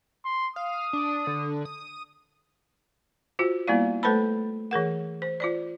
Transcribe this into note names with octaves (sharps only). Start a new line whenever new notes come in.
C6
F5 D#6
D4
D3
D#6
F4 F#4 C5
G3 A#3 B3 E4 D5 F5
A3 A4 B4 C5 A5 B5
E3 G#4 A#4 F#5
C5
F4 C5 D5